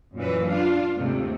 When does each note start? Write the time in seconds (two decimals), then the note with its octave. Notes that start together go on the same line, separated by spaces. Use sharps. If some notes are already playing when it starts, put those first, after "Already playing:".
0.16 F#2 A#2 E3 F#3 B4
0.48 D4 F4 F5
0.95 D#2 G#2 C3 A3